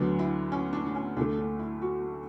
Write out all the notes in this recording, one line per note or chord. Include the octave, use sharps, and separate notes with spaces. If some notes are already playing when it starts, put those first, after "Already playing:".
Already playing: D2 D3 F#3 B3 D4
E4
C#4
D4
D4
C#4
D2 D3 A3 D4
D4
E4
F#4